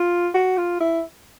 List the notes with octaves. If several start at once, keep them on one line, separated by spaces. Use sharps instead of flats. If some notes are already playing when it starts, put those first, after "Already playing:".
Already playing: F4
F#4
F4
E4